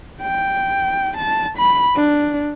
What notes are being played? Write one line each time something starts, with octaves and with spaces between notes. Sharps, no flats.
G5
A5
B5
D4